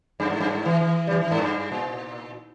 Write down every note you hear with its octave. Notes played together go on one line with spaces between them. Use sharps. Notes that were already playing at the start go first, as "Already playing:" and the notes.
G2
G#2
G2
G#2
E3
E3
G3
E3
E3
G#2
G2
A#2